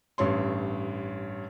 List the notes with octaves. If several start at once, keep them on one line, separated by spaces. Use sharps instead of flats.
A1 G2 C#5 C6